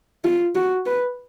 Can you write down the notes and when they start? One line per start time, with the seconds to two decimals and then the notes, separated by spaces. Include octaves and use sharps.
0.24 F4
0.55 F#4
0.86 B4